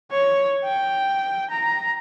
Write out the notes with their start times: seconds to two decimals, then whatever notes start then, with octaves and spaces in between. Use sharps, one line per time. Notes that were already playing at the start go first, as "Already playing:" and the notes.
0.12 C#5
0.65 G5
1.51 A#5